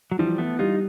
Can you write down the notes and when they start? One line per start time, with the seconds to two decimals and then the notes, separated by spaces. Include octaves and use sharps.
0.11 F#3
0.19 E3 F3 G3
0.38 A3 B3
0.59 G3 D#4 F4